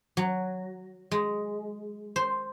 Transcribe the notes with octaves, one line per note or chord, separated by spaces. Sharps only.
F#3
G#3
C5